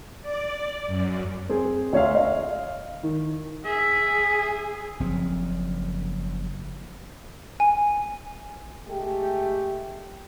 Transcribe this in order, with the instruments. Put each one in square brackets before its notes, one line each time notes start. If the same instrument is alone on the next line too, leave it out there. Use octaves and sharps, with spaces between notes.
[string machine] D5
F#2
[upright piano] C4 G#4
D2 C#5 E5 F5
D#5 F5
D#3
[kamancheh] G#4 [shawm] E5
[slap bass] F#1 F3 C4
[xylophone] G#5
[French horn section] G#3 A3 G4